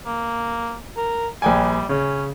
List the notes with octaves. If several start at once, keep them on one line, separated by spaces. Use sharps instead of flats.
A#3
A#4
A#1 G3 G5 G#5
C#3 C#4